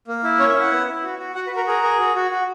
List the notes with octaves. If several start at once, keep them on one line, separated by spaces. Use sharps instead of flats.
A#3
E4
C#4 C#5
E5
E4
F#5
B3
E4
F#4
F#4
F#4 F#5
B4
F#4 A#4
G#4 A#4
G#4
F#4
F#4
F#4